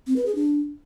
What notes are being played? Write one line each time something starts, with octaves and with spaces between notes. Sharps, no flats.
C4
B4
G#4
D4